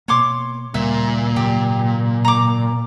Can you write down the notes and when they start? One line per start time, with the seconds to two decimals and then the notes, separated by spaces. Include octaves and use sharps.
0.08 B2 A#3 C#5 C6 D6
0.74 D2 A#2 C#3 G3 E5
1.36 G#2 C#3 F#3 G4
2.25 A#5 D6